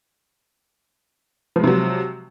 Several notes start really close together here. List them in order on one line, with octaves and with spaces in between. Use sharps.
F3 G#3 C3 F#3